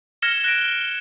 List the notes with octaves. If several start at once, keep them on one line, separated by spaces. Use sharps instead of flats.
F6 G#6 A#6 C#7 E7 G7
F#6 A#6 D7